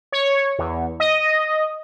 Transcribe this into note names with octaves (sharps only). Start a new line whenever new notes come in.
C#5
E2
D#5